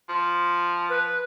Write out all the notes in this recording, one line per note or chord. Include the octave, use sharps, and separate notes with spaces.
F3
B4